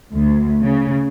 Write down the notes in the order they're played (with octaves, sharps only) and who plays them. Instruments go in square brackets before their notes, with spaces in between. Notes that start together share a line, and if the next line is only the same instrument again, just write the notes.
[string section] D2
C#3